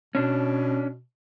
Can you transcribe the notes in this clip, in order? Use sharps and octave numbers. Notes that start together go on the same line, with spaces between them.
B2 C#4 D4